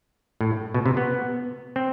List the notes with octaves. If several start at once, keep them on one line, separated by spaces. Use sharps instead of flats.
A2
B2
C3
B3
C4